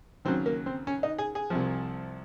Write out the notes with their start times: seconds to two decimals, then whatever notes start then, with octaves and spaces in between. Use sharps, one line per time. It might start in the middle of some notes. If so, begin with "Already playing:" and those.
0.25 D#2 C#3 F#3 C4
0.46 A#3
0.66 C4
0.87 C#4
1.03 D#4
1.19 G#4
1.35 G#4
1.50 C2 C3 F3